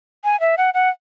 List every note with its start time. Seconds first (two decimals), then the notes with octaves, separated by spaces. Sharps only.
0.24 G#5
0.40 E5
0.57 F#5
0.74 F#5